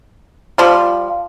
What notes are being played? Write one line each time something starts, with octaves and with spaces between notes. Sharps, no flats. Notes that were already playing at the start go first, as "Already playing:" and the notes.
F3 G3